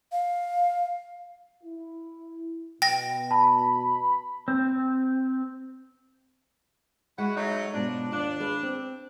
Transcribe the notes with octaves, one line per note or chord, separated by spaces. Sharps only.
F5
E4
B2 G5 A#6
A5 B5
C4
G#3 E4 F#4 F#5
F#3 A3 D#4
G#2 B2 D4 F4
D#2 D4 F4
G#4 B4 F5
C4